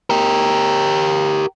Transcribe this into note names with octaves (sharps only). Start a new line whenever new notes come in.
G4 A#4